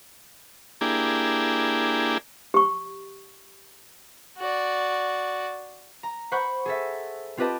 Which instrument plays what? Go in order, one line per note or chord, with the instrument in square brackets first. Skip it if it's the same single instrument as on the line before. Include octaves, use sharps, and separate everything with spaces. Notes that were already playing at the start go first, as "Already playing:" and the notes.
[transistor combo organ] A#3 D4 E4 G4 G#4
[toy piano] G4 C#6
[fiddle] F#4 D5
[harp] A#5
C5 F#5 B5 C#6 F#6 G6
G#4 A4 E5
C4 F4 G4 B4 D#5 A5